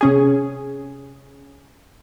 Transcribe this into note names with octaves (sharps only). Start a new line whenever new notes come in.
C3 C#4 G#4